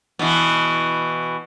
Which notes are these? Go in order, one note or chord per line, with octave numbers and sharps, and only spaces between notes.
B2 E3